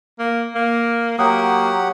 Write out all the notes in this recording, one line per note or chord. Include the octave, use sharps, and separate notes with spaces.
A#3
A#3
F#3 A#3 G4 F#5 A#5 D#6